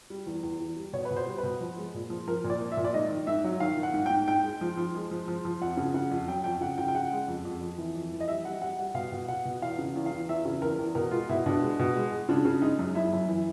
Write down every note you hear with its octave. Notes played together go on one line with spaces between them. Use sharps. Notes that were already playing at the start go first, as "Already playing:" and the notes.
G3
E2
E2
E2
G3
B2 C#5
B4
B2
C5
G3
B4
B2
F3
G#3
A#2
F3
F3 A#4
A#2
D5
F3
E5
A#2
D5
G#2 D#5
D#3
G#2 E5
F#3
D#3 F5
D#3
F#5
G#2
G5
G#2
G#2 G5
G#3
F3
F3
G#3
F3
F3
F3
F2 F#5
C#3
C#3 F#5
F2
F#3 G5
F2 G5
C#3 F#5
C#3 G5
G5
C#3 F#5
G#3
F2
F2
F2
E3
F2
E3
D#5
G3 E5
G3 F#5
G3 F#5
G3 F#5
B2 F5
B2
B2 F#5
B2
E2 F5
C#3
E2
F5
E2
E2 E5
C#3
E2 A#4
E2
B2 A#4
G#3 F4
B2 E4
B2 D4
G#3
B2
G#3
G#3
C#3 D4
C#3
G#3 D#4
F#2
F#2 E4
F#2
E3